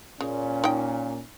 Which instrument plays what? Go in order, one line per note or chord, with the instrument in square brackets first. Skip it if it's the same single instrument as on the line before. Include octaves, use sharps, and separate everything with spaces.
[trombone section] A#2 [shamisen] C#3 [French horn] C#4
[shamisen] D#4 G5